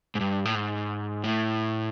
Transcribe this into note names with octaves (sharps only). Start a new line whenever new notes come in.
G#2
G2
A2
G#2
A2